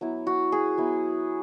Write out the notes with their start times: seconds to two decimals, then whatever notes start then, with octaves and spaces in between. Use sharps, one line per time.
0.01 F#3 B3 E4
0.27 F#4
0.52 G#4
0.78 F#3 B3 E4